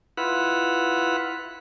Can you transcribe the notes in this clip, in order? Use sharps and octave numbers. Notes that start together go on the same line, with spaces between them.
E4 F4 B4 F#5